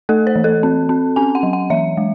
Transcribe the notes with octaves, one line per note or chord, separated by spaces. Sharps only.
A3 A4
C5
E3
A4
C4
C4
C#4 G#5
F#5
F#3
F#5
E3 E5
G#3